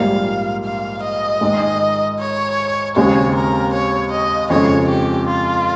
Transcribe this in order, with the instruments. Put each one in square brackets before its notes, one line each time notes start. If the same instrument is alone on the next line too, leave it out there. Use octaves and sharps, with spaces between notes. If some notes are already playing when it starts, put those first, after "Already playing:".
Already playing: [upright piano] A#1 G#2 G3 A#3 [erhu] F5
[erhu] F5
D#5
[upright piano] G#2 D#3 G#3
[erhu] C#5
[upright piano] D#2 C#3 G#3 C4 [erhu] C#5
[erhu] A#4
C#5
D#5
[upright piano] F2 C#3 G#3 [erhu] C#5
[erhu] G4
F4